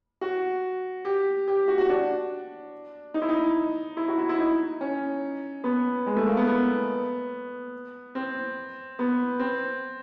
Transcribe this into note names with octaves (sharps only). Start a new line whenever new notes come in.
F#4
G4
G4
F#4
F#4
D4
D#4
E4
D#4
E4
F#4
E4
E4
D#4
C#4
B3
G#3
A3
A#3
B3
B3
C4
B3
C4